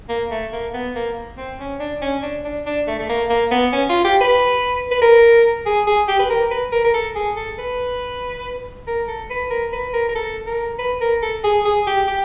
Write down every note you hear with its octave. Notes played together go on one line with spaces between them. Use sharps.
A#3
A3
A#3
B3
A#3
C4
C#4
D4
C#4
D4
D4
D4
A3
A3
A#3
A#3
B3
C#4
F4
G4
B4
B4
A#4
G#4
G#4
G4
B4
A#4
B4
A#4
A#4
A4
G#4
A4
B4
A#4
A4
B4
A#4
B4
A#4
A#4
A4
A#4
B4
A#4
A4
G#4
G#4
G4
G4